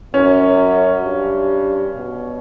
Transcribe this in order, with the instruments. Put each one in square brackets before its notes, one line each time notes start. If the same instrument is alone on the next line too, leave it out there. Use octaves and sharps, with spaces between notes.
[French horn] F#2 [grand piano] C#4
[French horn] G2
B2